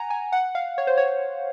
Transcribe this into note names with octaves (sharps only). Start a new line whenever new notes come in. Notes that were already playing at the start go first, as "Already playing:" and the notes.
Already playing: F#5 G#5 A#5
G#5
F#5
F5
C#5
C5
C#5